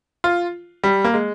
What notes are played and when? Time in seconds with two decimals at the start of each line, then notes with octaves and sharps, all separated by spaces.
0.24 F4
0.84 G3
1.04 A#3
1.14 G#3